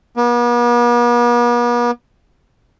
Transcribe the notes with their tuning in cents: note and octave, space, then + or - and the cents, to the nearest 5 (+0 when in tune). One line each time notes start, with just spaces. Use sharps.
B3 -45